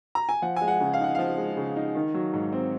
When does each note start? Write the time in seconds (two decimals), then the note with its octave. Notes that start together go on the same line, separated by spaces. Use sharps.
0.15 A#5
0.29 G#5
0.42 F3 F#5
0.56 G#3 G#5
0.68 F#5
0.80 C#3
0.93 F5
1.00 D#4 F#5
1.15 F3 F5
1.37 G#3
1.57 C#3
1.76 D#4
1.95 D#3
2.14 F#3
2.33 G#2
2.53 C4